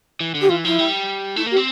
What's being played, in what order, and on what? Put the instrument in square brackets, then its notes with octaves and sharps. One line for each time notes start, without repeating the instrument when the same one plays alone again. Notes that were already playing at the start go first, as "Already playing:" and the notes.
[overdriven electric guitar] E3
D3
[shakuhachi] G4
[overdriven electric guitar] E3 [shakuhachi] F4
[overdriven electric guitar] F3 [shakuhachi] E4
[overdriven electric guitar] G3
[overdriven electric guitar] A3 [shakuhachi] E4
[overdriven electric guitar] A#3 [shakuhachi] G4
[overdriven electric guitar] C4